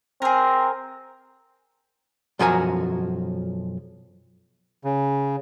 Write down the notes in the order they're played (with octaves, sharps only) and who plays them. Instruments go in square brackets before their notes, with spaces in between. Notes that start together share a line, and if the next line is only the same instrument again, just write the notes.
[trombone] C4 [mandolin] G#4 A#4
[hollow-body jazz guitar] B1 F#2 F3 F#4 A#4 G#5
[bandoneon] C#3